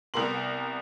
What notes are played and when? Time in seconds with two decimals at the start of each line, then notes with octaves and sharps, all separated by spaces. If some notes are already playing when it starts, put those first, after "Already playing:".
0.14 C2 B3 A#4 C6 F#7